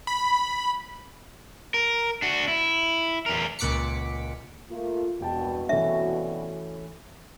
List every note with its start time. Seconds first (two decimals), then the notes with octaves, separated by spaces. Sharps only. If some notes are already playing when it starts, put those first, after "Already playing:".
0.07 B5
1.74 A#4
2.22 D4 F#4
2.48 E4
3.26 E2 A#4
3.59 C#2 A#2 F#5 D6 B6 C#7
4.71 A3 A#3 F4
5.20 E1 C2 G2 B2 F#4 G5 A5
5.69 E3 A3 C#4 E5